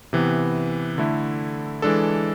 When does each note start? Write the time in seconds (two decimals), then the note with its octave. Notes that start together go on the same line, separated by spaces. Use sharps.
0.13 C3 E3 B3
0.98 D3 A3 E4
1.82 E3 G#3 D4 A4